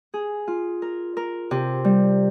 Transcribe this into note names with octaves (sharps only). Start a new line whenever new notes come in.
G#4
F4
A#4
A#4
C3
G3